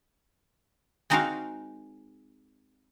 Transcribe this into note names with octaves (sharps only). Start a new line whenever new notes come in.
G#3 C4 D#4 F#4 A#4 F5